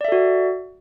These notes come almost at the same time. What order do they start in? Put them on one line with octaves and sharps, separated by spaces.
D5 E5 A4 F#4